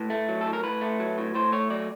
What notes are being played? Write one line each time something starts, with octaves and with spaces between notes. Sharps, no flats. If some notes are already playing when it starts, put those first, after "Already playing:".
Already playing: A2 B4
A3
F#3
A4
A2
A#4
A2 B4
A3
F#3
A2
A2 C5
A3 C#5
F#3 D5